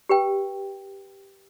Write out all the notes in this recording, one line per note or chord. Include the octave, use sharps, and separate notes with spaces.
G4 B4 G5